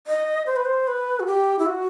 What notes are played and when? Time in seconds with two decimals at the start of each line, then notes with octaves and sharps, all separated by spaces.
0.07 D#5
0.46 C5
0.56 B4
0.65 C5
0.88 B4
1.20 F#4
1.27 G4
1.59 E4
1.66 F#4